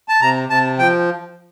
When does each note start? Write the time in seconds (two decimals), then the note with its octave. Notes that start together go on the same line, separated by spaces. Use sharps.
0.08 A5
0.21 C3 A#5
0.49 C3 A5
0.79 F3 G5